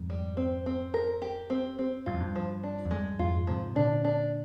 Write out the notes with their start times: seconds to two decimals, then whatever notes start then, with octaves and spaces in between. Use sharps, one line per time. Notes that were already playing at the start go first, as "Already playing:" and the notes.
Already playing: F2 G#2
0.10 G3
0.37 C4
0.66 C4
0.94 A#4
1.22 G4
1.50 C4
1.79 C4
2.06 G2 F4
2.14 F2
2.20 G2
2.36 F3
2.63 D4
2.85 F2
2.91 G2 G#3
3.19 F2 G#2 F4
3.47 G#2 C3 F3
3.75 A#2 D3 D4
4.05 D4